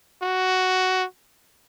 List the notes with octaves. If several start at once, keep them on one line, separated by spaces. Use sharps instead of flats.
F#4